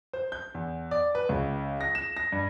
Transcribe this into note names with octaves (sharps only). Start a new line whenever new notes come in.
C5
G6
E2
D5
B4
C#2
A#6
E7
A#6
G2